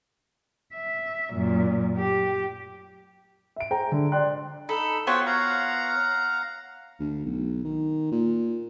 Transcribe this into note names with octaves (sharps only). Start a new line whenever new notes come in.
E5
F#2 A#2
G4
E5 D7
G#4 C5 G5 A#5
D3
D5 G5 C6 F#6
D#4 A4 B5
B3 F4 F#4 C5 C#5 G5
F5 F#5 A#5
D2
B1
D#3
A#2